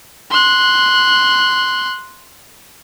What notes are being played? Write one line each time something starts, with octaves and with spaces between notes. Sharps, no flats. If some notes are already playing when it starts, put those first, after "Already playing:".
C6 F#6